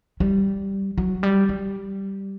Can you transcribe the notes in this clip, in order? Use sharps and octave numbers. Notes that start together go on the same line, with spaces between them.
G3
F#3
G3
G3